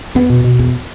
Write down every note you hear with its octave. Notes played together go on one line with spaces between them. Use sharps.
E2 B3
B2
B2
E2